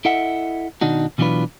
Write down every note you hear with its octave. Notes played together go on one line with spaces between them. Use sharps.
E4 A4 D#5 E5 F#5
B2 D#3 D4 D#4 F#4
B2 E3 F#3 D4 F4 B4